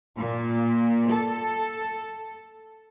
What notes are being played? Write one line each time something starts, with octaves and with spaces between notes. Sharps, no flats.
A#2
A4